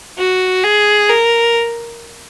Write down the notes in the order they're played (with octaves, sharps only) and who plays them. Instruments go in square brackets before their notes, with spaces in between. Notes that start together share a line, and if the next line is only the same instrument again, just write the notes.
[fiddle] F#4
G#4
A#4